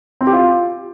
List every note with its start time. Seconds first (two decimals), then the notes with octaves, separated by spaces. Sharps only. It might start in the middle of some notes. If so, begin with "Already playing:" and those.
0.21 C4
0.27 G4
0.33 F4